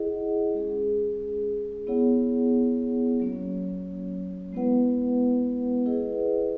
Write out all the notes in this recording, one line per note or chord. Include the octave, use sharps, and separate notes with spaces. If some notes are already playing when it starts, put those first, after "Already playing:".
Already playing: E4 G#4 D#5 F#5
G#3 C#4 G#4
B3 E4 G#4 C#5 F#5
F#3 A#3 C#4 F#4 C#5
G#3 B3 E4 B4 F#5
E4 G#4 B4 D#5 F#5